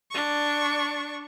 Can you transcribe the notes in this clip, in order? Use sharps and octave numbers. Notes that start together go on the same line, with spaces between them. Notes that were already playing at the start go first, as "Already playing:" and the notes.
D4 C#6